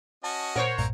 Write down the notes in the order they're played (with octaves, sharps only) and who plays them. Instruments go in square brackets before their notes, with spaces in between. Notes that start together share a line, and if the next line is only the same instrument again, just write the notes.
[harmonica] C#4 F#4 D#5 [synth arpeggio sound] A5
[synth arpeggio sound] A#2 [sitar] A#4 C#5 [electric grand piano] C5 F#5
[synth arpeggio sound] B1 G2 A#2 [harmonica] C4 A#5